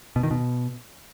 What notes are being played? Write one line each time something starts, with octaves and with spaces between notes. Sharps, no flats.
B2
D#3
B2